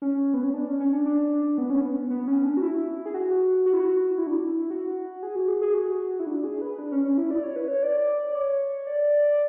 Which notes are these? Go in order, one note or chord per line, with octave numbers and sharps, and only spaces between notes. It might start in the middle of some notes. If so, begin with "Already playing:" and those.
C#4
B3
C#4
D4
C#4
C#4
D4
D4
B3
C#4
B3
B3
B3
C#4
D4
F#4
E4
G#4
F#4
F#4
E4
F#4
E4
D4
E4
F#4
G#4
F#4
G#4
G#4
F#4
E4
D4
G#4
B4
D4
C#4
C#4
E4
D5
C#5
B4
C#5
D5
C#5
D5